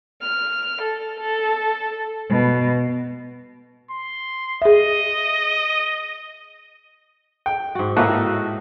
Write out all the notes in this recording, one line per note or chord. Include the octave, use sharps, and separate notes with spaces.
F6
A4
A4
B2
C6
G#4 D#5 E5
G5
G#2 F#4
A2 A#3 F#4 B4 D#5 E5